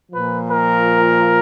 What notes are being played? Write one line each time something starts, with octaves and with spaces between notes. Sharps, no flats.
A#2 F3 B4
A#4